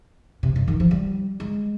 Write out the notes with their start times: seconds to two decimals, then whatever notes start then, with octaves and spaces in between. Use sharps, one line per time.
0.43 C3
0.56 G2
0.68 D#3
0.80 F3
0.91 G3
1.40 G#3